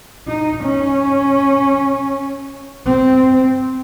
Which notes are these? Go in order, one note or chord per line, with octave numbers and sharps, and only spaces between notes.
D#4
C#4
C4